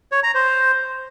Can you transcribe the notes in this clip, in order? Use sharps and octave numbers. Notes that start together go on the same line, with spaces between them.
C#5
A#5
C5